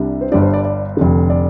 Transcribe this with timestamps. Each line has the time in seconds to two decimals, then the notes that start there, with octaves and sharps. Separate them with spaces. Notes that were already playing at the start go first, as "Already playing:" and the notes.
Already playing: C2 C3 G3 D4
0.21 C5
0.32 G1 G2 G3 D4 D5
0.42 C5
0.53 D5
0.65 D5
0.97 F1 F2 D3
1.30 D5